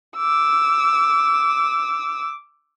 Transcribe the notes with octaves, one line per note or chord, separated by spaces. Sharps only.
D6 E6